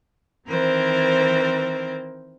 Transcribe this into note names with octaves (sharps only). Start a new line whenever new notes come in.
D#3 E3 C4 A#4 C5